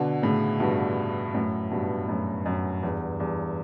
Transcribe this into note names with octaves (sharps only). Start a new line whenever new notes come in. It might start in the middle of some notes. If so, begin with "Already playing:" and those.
Already playing: B2 D3
A2 C#3
G2 B2
F#2 A2
G2 B2
F#2 A2
F#2
E2 G2
E2 G2